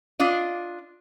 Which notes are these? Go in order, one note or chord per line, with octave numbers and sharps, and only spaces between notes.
D4 F4 D#5